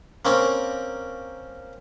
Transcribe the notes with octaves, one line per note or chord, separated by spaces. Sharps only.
A#3 C4 C#4